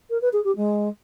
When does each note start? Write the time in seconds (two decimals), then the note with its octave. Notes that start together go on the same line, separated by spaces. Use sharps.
0.10 A#4
0.21 B4
0.33 G#4
0.44 G4
0.56 G#3